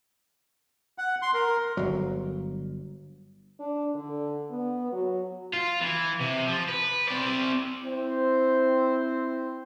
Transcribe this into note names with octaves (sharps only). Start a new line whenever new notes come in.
F#5
C6
A#4
G1 F#3
D4
D3
B3
F#3
F4
E3
C3
F3
B4
C4 D5
C4 E4 C5